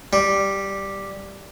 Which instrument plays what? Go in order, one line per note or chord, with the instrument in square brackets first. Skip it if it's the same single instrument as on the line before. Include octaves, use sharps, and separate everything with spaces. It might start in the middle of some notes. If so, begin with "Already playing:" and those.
[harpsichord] G3